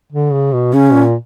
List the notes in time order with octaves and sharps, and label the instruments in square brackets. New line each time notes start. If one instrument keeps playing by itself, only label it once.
[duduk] D3
C#3
B2
[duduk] C#3 [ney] C#4
[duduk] A#2